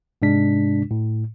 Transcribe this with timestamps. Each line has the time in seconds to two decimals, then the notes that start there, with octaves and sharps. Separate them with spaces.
0.22 G#2 C3 G#3 D4 B6
0.91 A2